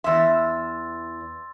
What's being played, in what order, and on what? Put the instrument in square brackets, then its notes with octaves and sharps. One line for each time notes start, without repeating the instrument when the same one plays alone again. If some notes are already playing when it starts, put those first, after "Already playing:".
[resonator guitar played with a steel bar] E2 E5 [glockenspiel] C6 E6 A6